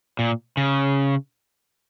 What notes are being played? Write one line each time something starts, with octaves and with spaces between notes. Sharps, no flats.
A#2
C#3